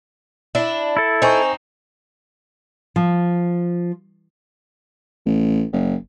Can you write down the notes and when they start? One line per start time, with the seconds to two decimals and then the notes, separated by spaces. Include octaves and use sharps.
0.55 D4 E4
0.97 E4 A4
1.22 C4 D#4 C5 G#5 C#6
2.96 F3
5.25 A1
5.73 F#1